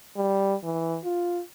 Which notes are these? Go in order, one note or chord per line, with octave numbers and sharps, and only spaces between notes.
G3
E3
F4